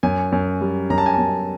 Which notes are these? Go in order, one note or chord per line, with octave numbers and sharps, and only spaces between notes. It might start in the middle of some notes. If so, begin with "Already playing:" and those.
F#2 G#5
F#2
G3
F#2 A#5
A5
G#5
F#2 A5